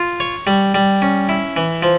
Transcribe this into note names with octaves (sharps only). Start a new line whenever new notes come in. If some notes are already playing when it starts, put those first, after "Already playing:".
Already playing: F4
C#5
G3
G3
C#4
E4
E3
F3